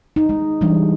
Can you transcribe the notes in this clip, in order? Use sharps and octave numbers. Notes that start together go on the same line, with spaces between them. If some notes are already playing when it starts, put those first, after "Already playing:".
D#4
G#3
E3 G3 G#3 D4